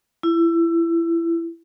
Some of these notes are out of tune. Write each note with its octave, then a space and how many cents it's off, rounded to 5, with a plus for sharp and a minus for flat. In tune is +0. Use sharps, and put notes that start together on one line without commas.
E4 +25